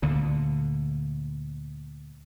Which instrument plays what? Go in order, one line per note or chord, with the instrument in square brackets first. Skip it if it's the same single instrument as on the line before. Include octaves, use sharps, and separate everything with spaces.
[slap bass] D2 A#2 D3